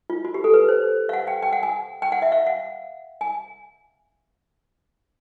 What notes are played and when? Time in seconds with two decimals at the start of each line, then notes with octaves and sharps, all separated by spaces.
0.10 F4
0.25 F#4
0.34 G4
0.44 A4
0.54 B4
0.68 C5
1.09 F5
1.13 F#5
1.27 G5
1.43 G5
1.53 F#5
1.63 G#5
2.02 G5
2.12 F#5
2.22 E5
2.32 F5
2.47 F#5
3.21 G#5